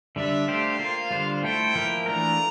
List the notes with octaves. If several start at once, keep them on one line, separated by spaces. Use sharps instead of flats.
D3 G3 D4 E5
A3 D4 G4 C5 F5
A#3 F4 C5
D3 G3 D4 F4 C5
A3 E4 A4 C5 G5
F3 A#3 E4 A#4
E3 A3 D4 F4 A#4 A#5